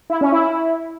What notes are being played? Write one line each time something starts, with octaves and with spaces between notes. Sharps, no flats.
E4
C#4
E4